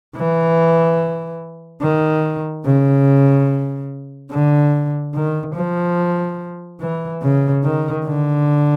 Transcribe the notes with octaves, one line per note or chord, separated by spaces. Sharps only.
E3
D#3
C#3
D3
D#3
F3
E3
C#3
D#3
D3